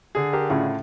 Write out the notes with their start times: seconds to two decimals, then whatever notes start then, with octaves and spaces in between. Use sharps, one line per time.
0.15 D3 G#4
0.33 G4 A#4
0.49 A2 C#3 F4